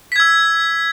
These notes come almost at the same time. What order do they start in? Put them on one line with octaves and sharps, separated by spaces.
B6 G#6 E6